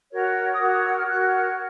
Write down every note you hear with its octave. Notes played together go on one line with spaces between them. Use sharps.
F#4 A#4 C#5
D#6
F#4 A#4 C#5 D6
D#6
E6
F6
F#4 A#4 C#5 F#6
F6